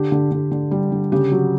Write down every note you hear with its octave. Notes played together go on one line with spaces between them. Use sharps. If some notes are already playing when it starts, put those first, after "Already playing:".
Already playing: D3 G4
D3
D3
D3
G3
D3
C#3 G4
F#3